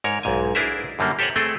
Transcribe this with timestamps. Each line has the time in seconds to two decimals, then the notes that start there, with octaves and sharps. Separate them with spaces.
0.04 G#2 A#4 C#5
0.23 B1 G#2 G#5
0.55 D4 E4 G#4 A#4 C5 E5
0.99 F#2 D3 G3 A#3
1.19 G4 A4 C5 C#5 D#5 F#5
1.36 A3 C4 G#4 A4 G5